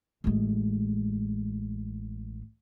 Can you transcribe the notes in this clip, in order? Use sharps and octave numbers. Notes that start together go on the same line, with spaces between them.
A1 G#3